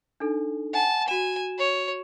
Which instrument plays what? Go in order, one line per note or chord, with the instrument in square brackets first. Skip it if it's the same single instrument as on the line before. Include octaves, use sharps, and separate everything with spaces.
[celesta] D4 D#4 A4
[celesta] F#5 G#5 [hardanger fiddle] A5
[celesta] F#4 E7 [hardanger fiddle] G#5
[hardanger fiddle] C#5